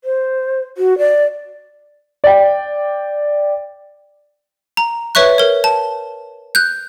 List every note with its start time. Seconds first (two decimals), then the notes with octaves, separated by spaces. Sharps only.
0.04 C5
0.78 F#4
0.98 D5
2.24 D5 G5
4.77 A#5
5.15 B4 C#5 E5 C#6 F#6
5.38 A#4 C#5
5.64 A5
6.55 F#6 G6